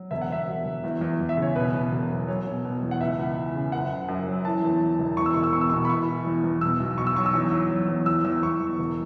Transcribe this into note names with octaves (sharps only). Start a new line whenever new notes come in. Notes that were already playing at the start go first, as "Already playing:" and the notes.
Already playing: F#3
E1 E5
F#5
E1 E5
E1
E1
E2
E2
E2
E5
C#3
C#5
B2 B4
B2
E1
F#3
F#3 C#5
B2
B2
E2
F#5
C#2 E5
C#2
E3
C#3
F#1 F#5
F#1
F#2
F#3
E3 A5
E2
E3
E1
E2 C#6
E6
E1 C#6
E6
B2 C#6
E6
C#6
B2
B5
E3 C#6
E3
E2
E2
B2 E6
B1
B1 C#6
E6
F#3 C#6
E6
E2
F#3
F#3
E2
E2 E6
E2 E6
E2 C#6
E2
E1